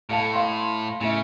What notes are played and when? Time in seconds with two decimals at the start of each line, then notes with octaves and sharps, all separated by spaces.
0.10 A2 A4 F5 A5
0.33 F5 C6
1.01 A2 C#3 E5